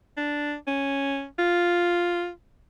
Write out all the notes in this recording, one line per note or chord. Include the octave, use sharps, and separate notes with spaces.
D4
C#4
F4